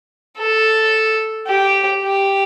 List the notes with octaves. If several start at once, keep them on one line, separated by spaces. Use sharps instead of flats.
A4
G4
G4